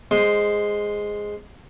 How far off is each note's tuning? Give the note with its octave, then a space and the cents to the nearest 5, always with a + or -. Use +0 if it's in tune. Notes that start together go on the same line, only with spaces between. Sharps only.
G#3 -5 C5 +0